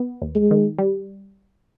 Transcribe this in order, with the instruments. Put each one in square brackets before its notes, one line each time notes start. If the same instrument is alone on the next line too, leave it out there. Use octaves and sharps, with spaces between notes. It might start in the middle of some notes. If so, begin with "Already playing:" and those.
Already playing: [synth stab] B3
D#2
[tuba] G#3
[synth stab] D#3
G3